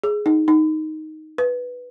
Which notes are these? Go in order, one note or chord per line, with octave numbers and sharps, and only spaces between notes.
G#4
D#4
D#4
B4